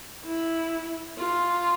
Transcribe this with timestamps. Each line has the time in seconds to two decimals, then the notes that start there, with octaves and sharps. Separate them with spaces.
0.25 E4
1.18 F4